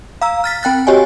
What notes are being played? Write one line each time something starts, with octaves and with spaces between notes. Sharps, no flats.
F5 A#5 E6
F6 A6 B6
C4 G5 F#6 A6
F#4 G4 C#5 D#5 G#5